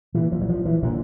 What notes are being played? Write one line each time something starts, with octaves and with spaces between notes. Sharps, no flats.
A#2 E3
F3
F#3
F3
E3
A#2 D3